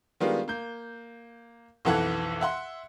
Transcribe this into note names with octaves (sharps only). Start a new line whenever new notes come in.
D#3 G3 G#3 B3 D4 F4
A#3 G6
B1 F2 E3 A4 F#5 G#6
E5 F#5 C6